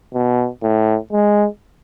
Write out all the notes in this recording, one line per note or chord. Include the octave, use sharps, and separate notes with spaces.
B2
A2
G#3